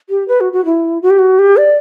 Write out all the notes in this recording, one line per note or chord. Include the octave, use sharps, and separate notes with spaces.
G4
B4
F#4
F#4
E4
F#4
G4
F#4
G4
D5